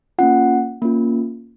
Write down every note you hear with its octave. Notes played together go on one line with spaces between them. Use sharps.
A#3 C#4 F4 F#5
A#3 C#4 F4